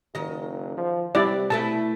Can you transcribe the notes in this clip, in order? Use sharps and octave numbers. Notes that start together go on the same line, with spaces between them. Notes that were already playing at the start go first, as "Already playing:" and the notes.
F#1 D#3 D#5
F3
C3 G3 E4 D5
B2 A3 E4 A5